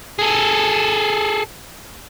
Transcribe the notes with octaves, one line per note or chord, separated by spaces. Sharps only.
G#4 A4